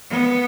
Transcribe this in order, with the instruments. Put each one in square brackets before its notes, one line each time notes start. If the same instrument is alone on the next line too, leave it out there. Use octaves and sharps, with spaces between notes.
[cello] B3